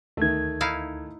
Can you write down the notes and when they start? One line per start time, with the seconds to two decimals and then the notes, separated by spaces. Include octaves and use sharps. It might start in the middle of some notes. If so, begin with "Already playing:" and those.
0.17 D2 D#3 A3 G#6
0.61 D#4 E4 F5